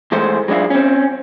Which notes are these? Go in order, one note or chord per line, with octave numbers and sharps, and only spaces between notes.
E3 G#3 A3 C5
F#3 G#3 D4 E4 F4
C4 C#4